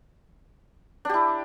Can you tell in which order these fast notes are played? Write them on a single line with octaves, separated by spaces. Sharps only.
D4 G4 E4